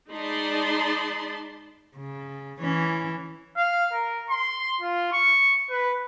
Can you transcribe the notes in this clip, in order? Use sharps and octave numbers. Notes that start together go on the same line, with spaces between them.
G#3 D#4 D5 A5 B5 C6
C#3
E3 C#4
F5
A#4
C6
F4
C#6
B4